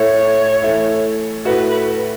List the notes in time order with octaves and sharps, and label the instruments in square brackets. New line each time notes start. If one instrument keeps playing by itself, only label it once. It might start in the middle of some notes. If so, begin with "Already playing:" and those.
Already playing: [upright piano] A2 A3 E4 [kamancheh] C#5
[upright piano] E3 A3 E4
[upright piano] A2 A3 F#4 [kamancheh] B4